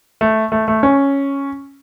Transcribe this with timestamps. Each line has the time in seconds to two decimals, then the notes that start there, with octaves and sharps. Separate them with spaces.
0.21 A3
0.52 A3
0.68 A3
0.83 C#4